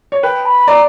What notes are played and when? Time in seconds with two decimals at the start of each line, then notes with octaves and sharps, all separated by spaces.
0.12 C#5
0.23 B4 G5
0.45 B5
0.68 D5 A#5